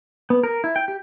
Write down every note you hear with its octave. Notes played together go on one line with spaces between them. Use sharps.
B3
A#4
E4
G5
G4